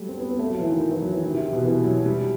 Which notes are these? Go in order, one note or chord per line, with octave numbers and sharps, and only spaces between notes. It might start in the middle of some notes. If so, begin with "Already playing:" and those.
Already playing: F#3 G3 A3
C4
B3
B3
A3
F#3
E3
D#3
D#3
E3
F#3
E3
D#3
C3
B2
E3
F#3
G3